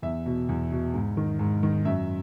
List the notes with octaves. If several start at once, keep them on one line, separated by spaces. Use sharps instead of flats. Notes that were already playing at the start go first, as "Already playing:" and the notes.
E2 E5
B2
E2
B2
G#2
D#3
G#2
D#3
F#2 E5